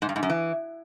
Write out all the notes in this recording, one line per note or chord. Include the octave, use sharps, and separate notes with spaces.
G#2
G2
G#2
F#2
E3